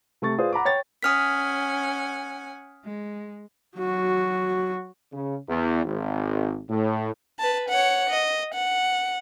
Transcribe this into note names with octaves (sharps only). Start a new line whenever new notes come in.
C3 A3 C#6 A6
F4 G#4 B4 C5 D5
F#5 A#5 B5 D6
C#5 G5 A6
C#4 F#5 G#5 D#6 F6 B6
G#3
F#3 F#4
C#3
E2
G#1
A2
B4 A5
C#5 F#5
D#5
F#5